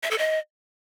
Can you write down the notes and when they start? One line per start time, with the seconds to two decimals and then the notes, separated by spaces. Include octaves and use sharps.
0.03 E5
0.11 A4
0.18 D#5